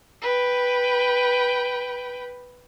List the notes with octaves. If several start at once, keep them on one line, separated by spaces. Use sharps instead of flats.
B4 G5